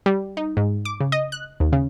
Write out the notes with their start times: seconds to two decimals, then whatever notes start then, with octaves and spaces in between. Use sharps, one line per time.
0.06 G3
0.37 D#4
0.57 G#2
0.85 D6
1.00 C#3
1.12 D#5
1.32 F#6
1.60 D#2
1.73 C#3